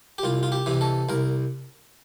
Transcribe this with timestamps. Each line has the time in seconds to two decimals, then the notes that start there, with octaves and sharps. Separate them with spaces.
0.18 G4
0.23 C2 F4
0.43 F4
0.52 G4
0.66 C3 E3
0.81 A4
1.09 C2 A#4